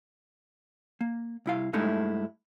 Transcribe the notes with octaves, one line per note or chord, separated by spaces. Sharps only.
A#3
C2 E4 F5
G2 G#3 A3 D#4 E4